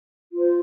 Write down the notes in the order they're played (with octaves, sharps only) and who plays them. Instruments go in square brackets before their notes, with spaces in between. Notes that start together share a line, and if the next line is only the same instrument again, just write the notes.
[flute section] F4 C5